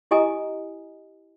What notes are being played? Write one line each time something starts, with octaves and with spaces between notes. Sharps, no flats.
E4 G4 D#5 G#5 A#5 D#6